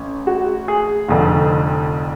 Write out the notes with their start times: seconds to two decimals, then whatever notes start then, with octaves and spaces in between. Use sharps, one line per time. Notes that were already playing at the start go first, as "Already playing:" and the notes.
Already playing: A1 C#4
0.27 F#4
0.68 G#4
1.08 F1 F2 D3